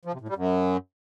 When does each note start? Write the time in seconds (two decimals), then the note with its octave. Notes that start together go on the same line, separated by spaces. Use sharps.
0.05 F3
0.13 C3
0.21 A2
0.29 G3
0.36 F#2